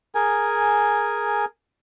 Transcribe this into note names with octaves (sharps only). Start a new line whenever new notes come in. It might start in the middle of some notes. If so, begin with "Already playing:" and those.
G#4 A#4 G#5